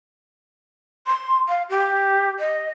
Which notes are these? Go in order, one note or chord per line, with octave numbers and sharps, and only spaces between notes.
C6
F5
G4
D#5